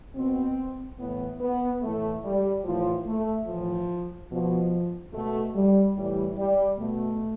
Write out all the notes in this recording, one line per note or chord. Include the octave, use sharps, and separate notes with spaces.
B2 C4
A2 E3 B3
B3
A2 E3 A3
G3
A2 E3 F3
A3
A2 E3 F3
B2 F3
B2 A3
G3
A2 E3 G3
G3
B2 A3